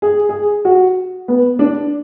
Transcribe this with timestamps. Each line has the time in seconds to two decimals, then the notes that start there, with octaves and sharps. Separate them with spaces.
0.02 G#4
0.29 G#4
0.65 F#4
1.28 B3
1.59 D4